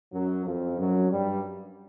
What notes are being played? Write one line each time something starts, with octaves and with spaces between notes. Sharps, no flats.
F#2 F#3
F2 F3
F#2 F#3
G2 G3